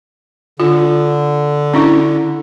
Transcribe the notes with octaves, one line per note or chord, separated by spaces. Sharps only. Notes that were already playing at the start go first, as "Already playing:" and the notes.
D3 F4
C#4 D4 E4